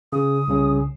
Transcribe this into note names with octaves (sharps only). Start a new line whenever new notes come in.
C#3 D#6
C2 C#3 C#4